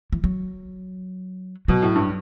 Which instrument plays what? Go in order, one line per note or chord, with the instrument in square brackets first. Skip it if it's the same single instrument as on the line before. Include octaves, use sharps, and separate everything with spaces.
[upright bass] E3
F#3
[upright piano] B2 [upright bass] F#3
[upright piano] A2
G2